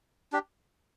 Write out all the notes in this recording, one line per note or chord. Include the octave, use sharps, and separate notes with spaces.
D4 G4